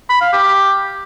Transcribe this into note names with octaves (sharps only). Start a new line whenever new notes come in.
B5
F5
G4